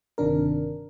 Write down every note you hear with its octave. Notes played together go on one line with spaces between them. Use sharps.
G1 C3 D#3 D4 A#4